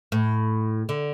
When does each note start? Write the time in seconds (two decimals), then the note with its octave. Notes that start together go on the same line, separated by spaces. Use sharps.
0.12 A2
0.89 D3